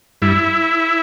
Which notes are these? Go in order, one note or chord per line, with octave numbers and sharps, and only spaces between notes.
G2 E4